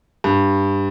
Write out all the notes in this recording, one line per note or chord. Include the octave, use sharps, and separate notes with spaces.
G2